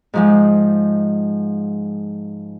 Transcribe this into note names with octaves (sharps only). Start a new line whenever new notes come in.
G#2 F3 G#3